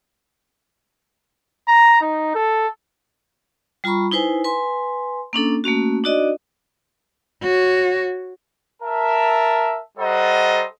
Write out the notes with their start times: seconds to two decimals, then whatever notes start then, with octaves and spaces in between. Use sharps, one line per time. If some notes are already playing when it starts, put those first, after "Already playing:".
1.68 A#5
2.01 D#4
2.35 A4
3.84 G3 F4 A#5 B5 C#6
4.11 D#4 E4 B4 C5 G#5
4.44 B4 G#5 C6
5.33 A#3 C#4 D4 A4
5.64 A3 A#3 C#4 F#4
6.04 D4 D#4 F#4 D5 D#5
7.43 F#4 C#5
8.82 A#4 E5 A5
9.98 G3 A4 C5 D#5 F#5 A#5